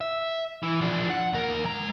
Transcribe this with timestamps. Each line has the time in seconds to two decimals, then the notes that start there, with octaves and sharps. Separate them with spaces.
0.01 E5
0.63 E3
0.81 F3 D4
1.10 F#5
1.33 D#2 A#4
1.65 G#3 A#5